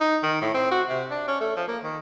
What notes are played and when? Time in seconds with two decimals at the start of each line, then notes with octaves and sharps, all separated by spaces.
0.01 D#4
0.23 D#3
0.42 A2
0.54 C4
0.71 F#4
0.89 C3
1.11 D4
1.28 C#4
1.41 A3
1.56 F3
1.68 A#3
1.84 D#3